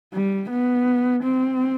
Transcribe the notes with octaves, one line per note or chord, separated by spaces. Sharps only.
G3
B3
C4